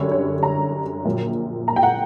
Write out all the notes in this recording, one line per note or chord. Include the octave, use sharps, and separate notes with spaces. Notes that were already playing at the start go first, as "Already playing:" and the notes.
Already playing: F#2 D3 G3 C#5
C#5
A#5
A#1 A#2 F#3
A#5
G5
F#5